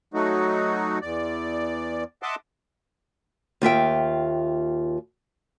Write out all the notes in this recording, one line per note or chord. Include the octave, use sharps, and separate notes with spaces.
F#3 A3 D#4 F#4
E2 D5
D#5 E5 F#5 A5 C6 D6
D#2 F4 E5 G5